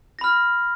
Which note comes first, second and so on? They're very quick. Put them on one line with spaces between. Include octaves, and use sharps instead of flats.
A#6 B5 F6